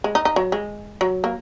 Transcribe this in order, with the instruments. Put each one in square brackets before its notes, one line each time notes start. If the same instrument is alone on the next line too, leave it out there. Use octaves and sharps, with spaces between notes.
[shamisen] G#3
D#4
D#4
F#3
G#3
F#3
A#3